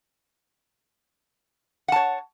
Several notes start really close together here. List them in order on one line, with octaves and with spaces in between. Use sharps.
F#5 A5 C#5